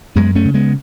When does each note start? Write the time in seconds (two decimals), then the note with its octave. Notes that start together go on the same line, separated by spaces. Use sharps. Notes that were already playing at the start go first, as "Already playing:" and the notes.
0.16 F#2 G#3 B3
0.35 A3 C#4
0.45 C#3
0.54 G#3 B3